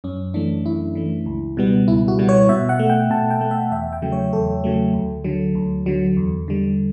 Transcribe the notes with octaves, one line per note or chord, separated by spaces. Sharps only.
F#2 C#4
E3 A3 D4
F#2 E4
E3 A3
C#2
B2 G3 B3
C#2 E4
F#4
B2 G3 B3
C#5
B2 E5
F#5
A3
G5
B2 A5
G5
A3
E5
E2 E5
G5
C#3 F#3 A3
C#5
E2 A4
C#3 F#3 A3
D2
D3 F#3
D2
D3 F#3
E2
D3 G3